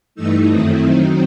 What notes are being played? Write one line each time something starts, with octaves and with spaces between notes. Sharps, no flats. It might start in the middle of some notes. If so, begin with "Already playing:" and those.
G2 E3 A3 D#4 E6
F#2 D#3 A3 C4 E4 D#6
D#3 F#3 C4 D#4